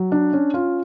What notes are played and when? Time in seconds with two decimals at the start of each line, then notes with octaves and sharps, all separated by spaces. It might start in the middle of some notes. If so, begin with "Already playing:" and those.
Already playing: F#3
0.12 D4
0.33 C#4
0.54 F4